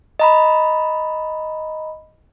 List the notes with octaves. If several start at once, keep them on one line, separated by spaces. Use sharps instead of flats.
D#5 A#5 B5